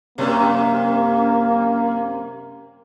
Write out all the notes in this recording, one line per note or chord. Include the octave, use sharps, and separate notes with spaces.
F#2 C3 A#3